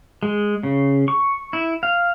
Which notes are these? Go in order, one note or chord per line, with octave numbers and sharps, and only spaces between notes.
G#3
C#3
C#6
E4
F5